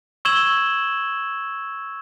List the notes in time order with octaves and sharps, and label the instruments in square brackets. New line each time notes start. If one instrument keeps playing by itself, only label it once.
[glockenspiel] C#6 E6 G#6 E7 F#7 G7